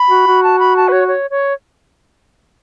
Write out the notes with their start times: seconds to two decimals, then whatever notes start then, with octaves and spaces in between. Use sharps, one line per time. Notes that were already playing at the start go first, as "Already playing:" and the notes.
Already playing: B5
0.10 F#4
0.27 F#4
0.43 A5
0.59 B5
0.76 A5
0.88 B4
0.92 C#5
1.08 C#5
1.30 C#5